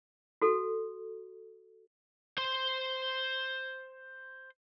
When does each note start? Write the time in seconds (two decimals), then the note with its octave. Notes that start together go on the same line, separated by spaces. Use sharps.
0.42 F#4 A4
2.38 C5 C6